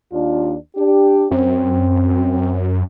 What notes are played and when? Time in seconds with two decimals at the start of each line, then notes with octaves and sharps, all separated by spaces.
0.12 D#2 D4 F4
0.76 D4 G4
1.31 F#2 C4